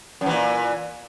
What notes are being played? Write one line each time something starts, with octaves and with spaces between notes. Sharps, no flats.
F#2 A#2 E3